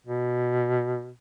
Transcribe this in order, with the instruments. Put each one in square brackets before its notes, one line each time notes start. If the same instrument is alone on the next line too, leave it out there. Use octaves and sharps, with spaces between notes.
[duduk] B2